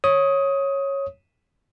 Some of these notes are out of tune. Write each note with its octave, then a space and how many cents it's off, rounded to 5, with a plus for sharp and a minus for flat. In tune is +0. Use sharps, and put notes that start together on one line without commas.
C#5 -10 D#6 +15